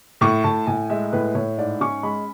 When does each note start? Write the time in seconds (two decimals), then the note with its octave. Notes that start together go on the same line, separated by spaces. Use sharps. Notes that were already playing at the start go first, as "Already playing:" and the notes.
0.21 A2 C#6
0.44 A2 A5
0.67 A2 G#5
0.90 G#3 E5
1.12 A2 B4
1.35 A2 C#5
1.58 G#2 D5
1.81 C#4 C#6
2.03 G#3 B5